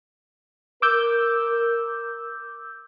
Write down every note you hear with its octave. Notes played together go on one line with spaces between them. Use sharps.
A#4 D6 E6 G6